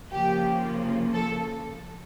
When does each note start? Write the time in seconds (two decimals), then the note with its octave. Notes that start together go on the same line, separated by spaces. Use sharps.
0.12 C#3 F3 A#3 G4
1.14 A4